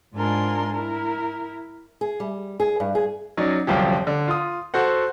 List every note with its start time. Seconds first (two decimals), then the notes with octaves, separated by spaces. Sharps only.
0.15 G#2 D4 F4 A#4 G#5 C6
0.73 E4 A#4
2.01 G#4
2.20 G3
2.60 G#4
2.80 G2
2.95 G#4
3.37 F#3 C#4 D#4 D5
3.67 G1 C2 F#2 F3 G4
4.07 D3
4.28 F4 D#6
4.74 F#4 A4 C5 F#5